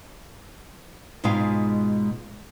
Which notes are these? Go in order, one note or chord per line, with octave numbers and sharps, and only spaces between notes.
G#2 B2 G#3 F4 F5 G#5